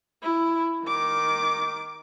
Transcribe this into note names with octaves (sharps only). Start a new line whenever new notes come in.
E4
D#3 D6